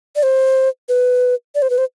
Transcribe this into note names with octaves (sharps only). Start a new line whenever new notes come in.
D5
C5
B4
D5
C5
B4
C5